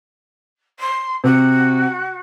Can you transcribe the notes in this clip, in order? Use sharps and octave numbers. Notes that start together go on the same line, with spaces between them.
C6
C3 F#4